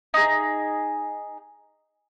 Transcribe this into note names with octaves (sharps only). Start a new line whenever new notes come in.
D#4 G#4